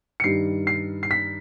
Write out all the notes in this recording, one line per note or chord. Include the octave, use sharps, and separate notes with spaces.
C#7
G2 D#3 G3 C7
C7
C7
B6